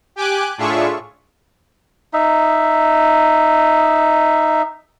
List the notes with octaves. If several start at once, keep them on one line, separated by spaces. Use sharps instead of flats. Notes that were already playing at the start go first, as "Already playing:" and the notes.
G4 G5 G#5 D6 F#6
A2 D4 F4 G#4 E5 C#6
D#4 E5